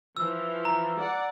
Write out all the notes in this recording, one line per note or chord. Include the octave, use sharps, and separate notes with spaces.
E3 F3 E6
A#5
D5 F#5